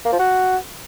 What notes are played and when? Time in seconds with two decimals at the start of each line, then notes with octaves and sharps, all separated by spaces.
0.05 A#3
0.12 F3
0.19 F#4